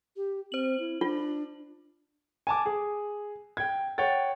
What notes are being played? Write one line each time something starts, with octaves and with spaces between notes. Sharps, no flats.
G4
C4 C5 F#7
E4
D4 F4
G#5 A5 D6
G#4
G5 G#6
C#5 F#5 G5 A6